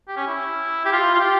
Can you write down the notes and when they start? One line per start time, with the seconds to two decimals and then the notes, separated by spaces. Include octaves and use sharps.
0.08 G4
0.17 C#4
0.27 E4
0.85 G4
0.92 F4
1.14 F4
1.20 G4